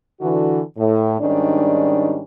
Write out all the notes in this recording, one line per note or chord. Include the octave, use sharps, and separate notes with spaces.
D3 E3 F#4
A2
G#2 D#3 G3 C#4 D4